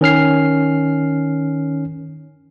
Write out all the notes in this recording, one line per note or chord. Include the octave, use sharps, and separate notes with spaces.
D#3 C#4 F6 C7